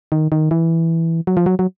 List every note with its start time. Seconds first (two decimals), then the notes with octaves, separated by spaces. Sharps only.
0.12 D#3
0.32 D#3
0.51 E3
1.27 F#3
1.37 F3
1.46 F#3
1.59 F#3